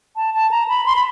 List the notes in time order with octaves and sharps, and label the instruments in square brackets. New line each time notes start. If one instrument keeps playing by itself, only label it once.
[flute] A5
A5
A#5
B5
C6
B5